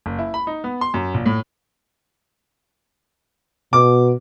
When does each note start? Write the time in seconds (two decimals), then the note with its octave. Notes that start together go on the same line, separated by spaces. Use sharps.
0.06 F#1
0.19 E4
0.34 B5
0.47 D#4
0.64 B3
0.81 C6
0.94 F#2
1.14 A#1
1.26 A2
3.73 B2 D6